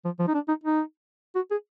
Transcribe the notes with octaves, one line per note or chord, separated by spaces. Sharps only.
F3
F3
D#4
D4
D#4
D#4
F#4
G#4